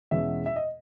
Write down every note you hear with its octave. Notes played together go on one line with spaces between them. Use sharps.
E2 B2 G#3 C#4 E5
E5
D#5